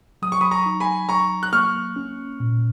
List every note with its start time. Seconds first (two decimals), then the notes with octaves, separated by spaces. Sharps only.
0.22 F#3 D#6
0.32 C#6
0.41 B5 D#6
0.51 A#5 C#6
0.66 D#4
0.80 G#5 B5
1.09 F#3 A#5 C#6
1.43 F#6
1.53 A#3 C#6 F6
1.96 C#4
2.40 A#2